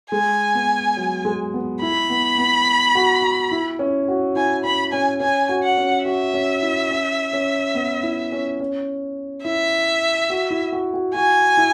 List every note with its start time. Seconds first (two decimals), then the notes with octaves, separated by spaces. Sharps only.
0.11 G#3 G#5
0.55 B3
0.97 F#3
1.25 G#3
1.54 B3
1.82 E4 B5
2.10 B3
2.38 B3
2.95 F#4
3.22 F#4
3.51 E4
3.79 C#4
4.08 F#4
4.36 E4 G#5
4.64 C#4 B5
4.93 C#4 G#5
5.20 C#4 G#5
5.49 F#4
5.63 F#5
5.78 C#4
6.05 F#4 E5
6.34 C#4
6.63 E4
6.91 C#4
7.33 C#4
7.75 B3
8.03 E4
8.32 C#4
8.60 C#4
9.45 E4 E5
10.30 F#4
10.51 E4
10.72 F#4
10.94 F#4
11.15 F#4 G#5
11.57 E4